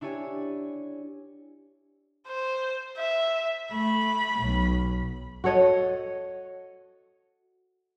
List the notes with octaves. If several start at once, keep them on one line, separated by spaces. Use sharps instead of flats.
D4 E4 G4 C#5 G#5
C5
E5
A3 B5
B1
F#4 A4 C#5 D#5